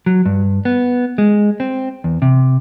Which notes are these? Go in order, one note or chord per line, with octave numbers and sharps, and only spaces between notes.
F#3
G2
B3
G#3
C4
E2
C3